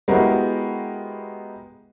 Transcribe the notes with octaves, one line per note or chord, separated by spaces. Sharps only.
G#3 B3 E4 F#4 G4 A#4